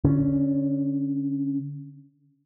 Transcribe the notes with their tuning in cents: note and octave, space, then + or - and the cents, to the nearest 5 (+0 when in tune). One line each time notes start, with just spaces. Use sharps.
D3 -20 C#4 +0